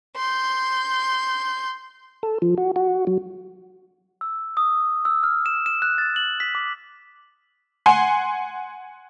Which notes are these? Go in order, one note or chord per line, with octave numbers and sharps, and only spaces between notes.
C6 G6
A4
F3
F#4
F#4
F#3
E6
D#6
E6
F6
E7
E7
F#6
A6
F#7
B6
D6
F#5 G#5 C6